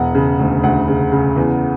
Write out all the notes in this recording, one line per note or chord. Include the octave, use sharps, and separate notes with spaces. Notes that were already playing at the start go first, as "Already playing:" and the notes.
Already playing: E1 F#5
C#3
D2
D2 F#5
C#3
C#3
E2